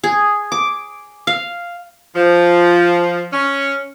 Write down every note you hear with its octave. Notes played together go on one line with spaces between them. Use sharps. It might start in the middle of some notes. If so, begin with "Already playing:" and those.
G#4
D6
F5
F3
C#4